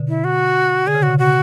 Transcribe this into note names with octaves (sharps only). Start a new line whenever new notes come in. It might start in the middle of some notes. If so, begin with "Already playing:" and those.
Already playing: B2 D3
E4
F#4
D3 G#4
C#3
B2 F#4
C#3
F#4